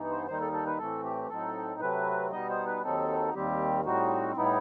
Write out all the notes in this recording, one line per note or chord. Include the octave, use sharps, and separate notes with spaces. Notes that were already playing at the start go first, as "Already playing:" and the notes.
Already playing: G2 E3 B3 D#4
C5
D#2 D#3 G3 D#4 C5
A4
A4
B4
A2 E3 A3 C4 A4
G4
A2 F#3 C4 D#4 A4
C3 F#3 A3 C4 B4
B2 G3 B3 D#4 D#5
C5
B4
D#2 D#3 F#3 C4 D#4 A4
D#2 D#3 G3 C4 G4
A2 G3 C4 D#4 F#4
A2 G3 B3 D#4 E4